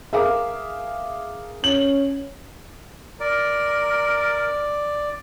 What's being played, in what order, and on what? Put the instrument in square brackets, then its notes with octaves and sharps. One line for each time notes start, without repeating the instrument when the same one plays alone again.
[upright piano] G#4 A#4 [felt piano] E5 F5 D6
[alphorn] C#4 [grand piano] F#7
[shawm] A#4 [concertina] D5